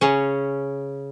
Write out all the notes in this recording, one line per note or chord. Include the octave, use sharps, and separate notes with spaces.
C#3 C#4